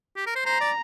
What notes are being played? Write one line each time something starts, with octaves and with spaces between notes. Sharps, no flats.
G4
A#4
C5
C5 A#5
D5